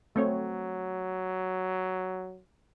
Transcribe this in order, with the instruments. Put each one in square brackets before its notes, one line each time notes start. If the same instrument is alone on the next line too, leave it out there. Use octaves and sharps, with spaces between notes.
[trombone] F#3 [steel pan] A3 C4 C#5